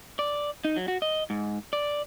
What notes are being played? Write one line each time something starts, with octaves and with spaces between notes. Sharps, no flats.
D5
D#4
F#3
F#4
D#5
G#2
D5